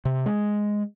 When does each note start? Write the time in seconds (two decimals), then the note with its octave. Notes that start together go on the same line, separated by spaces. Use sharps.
0.05 C3
0.26 G#3